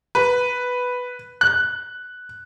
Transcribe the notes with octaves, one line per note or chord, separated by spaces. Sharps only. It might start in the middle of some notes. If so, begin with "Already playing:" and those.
B4
F#6